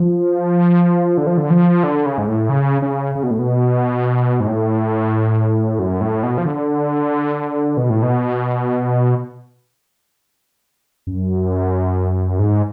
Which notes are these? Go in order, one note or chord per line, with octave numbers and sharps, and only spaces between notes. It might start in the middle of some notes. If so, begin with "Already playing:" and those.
Already playing: F3
D3
F3
D3
F3
D3
C#3
G#2
A2
C#3
C#3
C#3
B2
A2
B2
G#2
A2
F#2
A2
B2
F3
D3
B2
A2
B2
F#2
G#2